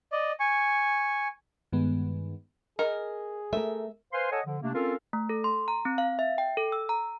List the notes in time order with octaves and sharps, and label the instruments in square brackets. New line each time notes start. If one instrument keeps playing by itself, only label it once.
[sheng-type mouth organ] D5 D#5
G#5 C#6
[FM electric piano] G2 D#3 G#3 B3
[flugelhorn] G#4 [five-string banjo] A#4 [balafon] D#5
[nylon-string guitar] A3 A#4 [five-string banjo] E5
[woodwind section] B4 C5 F5 G#5 C6
A4 C#5 D#5 F#5 G#5 A5
D3 F3
C3 A3 A#3 D4
C4 C#4 F4 A4 A#4 F5
[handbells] A3
A4
C6
A#5
C4
F5
E5
G5
A4
E6
A#5